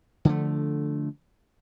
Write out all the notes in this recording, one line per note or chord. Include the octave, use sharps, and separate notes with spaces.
D3 F3 A3